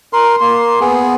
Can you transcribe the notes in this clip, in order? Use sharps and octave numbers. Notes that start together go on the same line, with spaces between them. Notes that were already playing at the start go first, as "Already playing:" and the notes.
A#4 C6
A#3 C6
B3 G#4